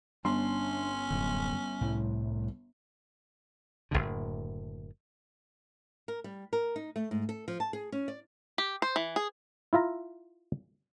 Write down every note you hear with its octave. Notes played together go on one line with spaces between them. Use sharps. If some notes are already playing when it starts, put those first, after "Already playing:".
G1 C#4 D4 C6
D1 F#2 D3
C2 A2
F#1 B1 A2 D3
A#4
G3
A#4
D#4
A3
G#2
A4
F3
A5
G#4
C#4
D5
G4
C5
E3
G#4
E4 F4 E5 A#5